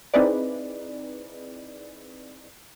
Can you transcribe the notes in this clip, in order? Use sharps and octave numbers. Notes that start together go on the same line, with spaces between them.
C4 D#4 E4 G#4 B4 D5